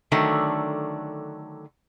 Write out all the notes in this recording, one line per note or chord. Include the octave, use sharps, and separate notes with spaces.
D3 D#3 F#3 A3 D4